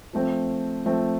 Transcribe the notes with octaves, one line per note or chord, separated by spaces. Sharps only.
F3 A3 C4
F3 A3 C4